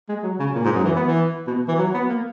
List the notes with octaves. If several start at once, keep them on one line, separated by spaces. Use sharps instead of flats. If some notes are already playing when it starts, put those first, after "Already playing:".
G#3
F#3
C#3
A#2
G#2
F#2
E3
B3
E3
B2
E3
F#3
B3
A#3